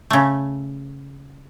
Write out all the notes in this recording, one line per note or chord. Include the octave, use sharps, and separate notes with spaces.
C#3 A3